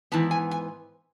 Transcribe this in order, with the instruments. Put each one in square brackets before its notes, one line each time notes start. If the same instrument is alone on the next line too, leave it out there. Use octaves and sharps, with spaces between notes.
[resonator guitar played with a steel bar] G#2 E3 B3 A5
G#5
G#5